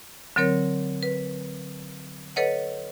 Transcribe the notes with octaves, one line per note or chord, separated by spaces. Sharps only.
D3 F#3 C4 A#4 C#5
B4
A4 B4 C#5 D#5 F#5